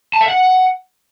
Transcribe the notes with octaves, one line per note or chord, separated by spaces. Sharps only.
A5
E5
F#5